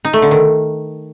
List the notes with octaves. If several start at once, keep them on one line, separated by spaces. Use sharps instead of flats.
D#4
A3
D3
D#3